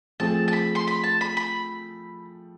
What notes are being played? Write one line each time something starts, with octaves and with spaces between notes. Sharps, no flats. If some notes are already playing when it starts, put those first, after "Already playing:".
F3 A3 C4 G#4 A5
A5
B5
C6
B5
A5
B5
B5